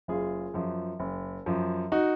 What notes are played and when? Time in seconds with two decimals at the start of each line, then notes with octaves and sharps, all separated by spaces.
0.08 F#1 F4 G#4
0.54 F#2 F3
0.99 F#1
1.46 F#2 F3
1.92 D#4 F#4